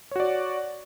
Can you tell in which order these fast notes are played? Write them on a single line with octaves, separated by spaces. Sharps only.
C#5 F#4 D5